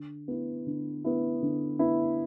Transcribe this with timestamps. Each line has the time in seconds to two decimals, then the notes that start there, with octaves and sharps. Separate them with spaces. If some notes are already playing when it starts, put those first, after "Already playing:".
Already playing: D3
0.28 B3 E4
0.66 D3
1.04 B3 E4
1.42 D3
1.79 B3 E4